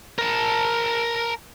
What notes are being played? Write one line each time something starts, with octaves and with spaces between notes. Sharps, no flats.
A#4 A5